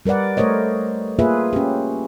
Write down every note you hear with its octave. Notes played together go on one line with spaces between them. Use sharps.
G3 A#4 B4 D5 F#5
A3 A#4 C5 C#5 D#5
A#3 F4 G#4 B4 E5
C#4 G4